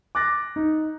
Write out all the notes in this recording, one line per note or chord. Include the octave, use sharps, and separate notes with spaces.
D6 F#6 A6 A#6
D#4